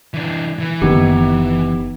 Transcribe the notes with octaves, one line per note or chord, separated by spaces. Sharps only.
E3 D4
E3
F#1 D#3 B3 D#4 G4